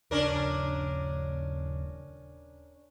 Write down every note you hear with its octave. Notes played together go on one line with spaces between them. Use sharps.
D#1 C#3 C#4 D4 A#4